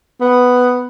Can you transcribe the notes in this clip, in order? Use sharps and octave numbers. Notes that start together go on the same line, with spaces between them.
B3